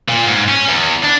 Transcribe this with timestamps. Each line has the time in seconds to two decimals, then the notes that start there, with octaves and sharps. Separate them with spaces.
0.09 A#2
0.27 G#2
0.49 C#4
0.69 E2
1.03 D4